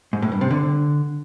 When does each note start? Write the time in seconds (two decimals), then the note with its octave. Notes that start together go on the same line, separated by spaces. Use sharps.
0.13 G#2
0.22 A2
0.32 G2
0.41 C3
0.51 D3